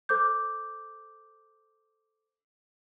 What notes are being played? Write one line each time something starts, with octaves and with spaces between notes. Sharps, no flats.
A4 C5 D6 G6